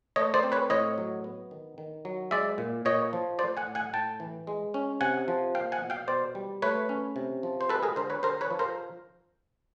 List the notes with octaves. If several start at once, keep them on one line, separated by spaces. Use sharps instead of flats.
A3 C#5 D#5
C5 D5
C4
B4 C#5
A2 C#5 D#5
F#3
B3
D#3
D#3
F#3
G#3 D5 E5
A#2
A#2 C#5 D#5
F3
A3 C5 D5
F#5 G#5
A2
F#5 G#5
A2 G5 A5
E3
G#3
C#4
C3 F#5 G#5
F3
A#3 F5 G5
F#5 G#5
B2
F5 G5
B2 C5 D5
G3
A3 B4 C#5
C#4
C3
F3
C5
G#3 A4 B4
G#4 A#4
D3 A#4 C5
B4 C#5
D3 A#4 C5
B4 C#5
F3
A#4 C5